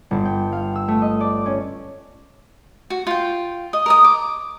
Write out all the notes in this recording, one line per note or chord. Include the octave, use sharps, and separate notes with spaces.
G1
G5
F5
E6
A3
D#5
D5
C#4
F#4
F4 G5
D#5
A#4 A#5 D#6
D6